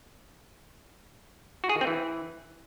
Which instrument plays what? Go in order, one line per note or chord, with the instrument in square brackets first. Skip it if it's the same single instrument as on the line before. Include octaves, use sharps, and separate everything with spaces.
[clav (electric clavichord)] F#4
G#4
D#3
C4
E3